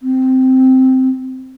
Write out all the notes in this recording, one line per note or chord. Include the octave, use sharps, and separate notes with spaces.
C4